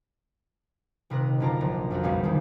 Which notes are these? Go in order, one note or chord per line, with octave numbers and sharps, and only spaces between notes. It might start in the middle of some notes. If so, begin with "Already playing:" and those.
D#1 C3 A#4 D#5 F#6
F#1 D3 C#4 F4 D5 A#5
A#1
F2 A#2 F#4 A#4
F#1 B1 G3 C#4 G#4 F5
D#2 D#3 G#3